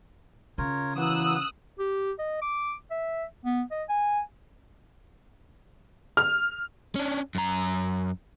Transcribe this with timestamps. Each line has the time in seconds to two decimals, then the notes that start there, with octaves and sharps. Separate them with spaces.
0.58 C#3 F4 A#4 C#5
0.97 E3 F#3 A#3 B3 D#6 E6 F#6
1.79 G4
2.19 D#5
2.42 D6
2.91 E5
3.45 B3
3.71 D#5
3.89 G#5
6.17 F6
6.96 C#4 D4
7.35 F#2 A#5